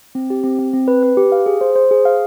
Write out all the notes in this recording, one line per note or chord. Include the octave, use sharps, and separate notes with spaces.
C4
G4
C4
C4
C4
B4
B4
G4
F5
G#4
C5
C5
G#4
F5